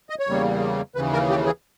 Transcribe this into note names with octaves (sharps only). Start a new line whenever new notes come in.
D#5
C#5
E2 C#3 G3 A#3
D#2 C#3 E3 B4
A#4
G4
G#4